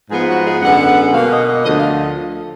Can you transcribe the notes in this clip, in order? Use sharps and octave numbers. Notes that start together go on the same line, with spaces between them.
G#2 F3 B3 G#4
F#4
G#4
F#2 D3 G#3 B3 F#5
B2 A#3 F5
D#5
D#5
D2 D3 F3 D#5
F5